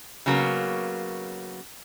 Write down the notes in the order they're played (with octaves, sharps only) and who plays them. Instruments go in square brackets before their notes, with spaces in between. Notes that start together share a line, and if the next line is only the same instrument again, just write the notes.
[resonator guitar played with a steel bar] C#3 F#3 A#3 B3